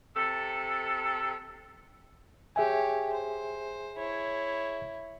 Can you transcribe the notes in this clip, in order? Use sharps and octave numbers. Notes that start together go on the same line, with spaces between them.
C3 A4
G4 G#4 C#5 E5 G#5
C5
E4 C#5